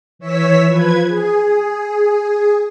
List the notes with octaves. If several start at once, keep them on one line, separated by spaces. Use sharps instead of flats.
E3 C#5 E6 B6
F3 B4 G#6
G#4